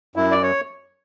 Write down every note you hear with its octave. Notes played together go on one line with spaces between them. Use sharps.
F#2 E4
D5
C#5